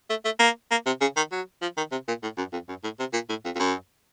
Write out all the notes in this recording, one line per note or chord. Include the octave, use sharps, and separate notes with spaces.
A3
A3
A#3
A#3
C3
C#3
D#3
F#3
F3
D#3
C3
A#2
A2
F#2
F2
F#2
A2
C3
A#2
A2
F2
F2
F#2